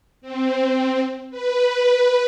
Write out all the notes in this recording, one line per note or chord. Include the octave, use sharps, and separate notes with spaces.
C4
B4